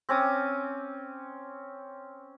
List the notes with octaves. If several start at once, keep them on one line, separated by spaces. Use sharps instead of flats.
C4 C#4 D6 D#6